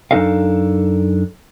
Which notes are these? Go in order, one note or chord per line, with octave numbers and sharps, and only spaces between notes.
F#2 D4 D#4 A4 D#5 F5